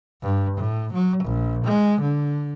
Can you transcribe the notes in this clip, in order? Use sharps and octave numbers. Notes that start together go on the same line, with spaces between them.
G2
A2
F#3
A#1
G#3
D3